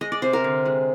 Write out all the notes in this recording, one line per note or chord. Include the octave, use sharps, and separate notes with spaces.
G#3 D#5
D5
C3 C5
A#4
D3
G#3